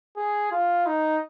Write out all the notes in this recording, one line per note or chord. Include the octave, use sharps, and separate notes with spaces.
G#4
F4
D#4